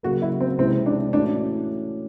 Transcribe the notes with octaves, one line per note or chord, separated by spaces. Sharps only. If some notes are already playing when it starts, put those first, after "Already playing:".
C#3 F#3 A#3 F#4
E4
C4
C3 E3 G#3 C4 C#4 E4
D4
A2 E3 A3 C#4 D4 F#4